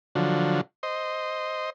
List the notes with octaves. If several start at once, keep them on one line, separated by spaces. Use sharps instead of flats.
D3 F3 F#3
C5 D#5